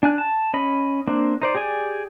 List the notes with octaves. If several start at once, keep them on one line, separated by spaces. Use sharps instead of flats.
D4 G#5 F#6
A5
C#4 D#5 B5
A#3 C4 D4
D#4 C5 D5
G4 G#4 D5 G#5